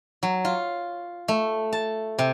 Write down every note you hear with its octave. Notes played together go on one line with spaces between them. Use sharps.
F#3
F4
A3
A5
C3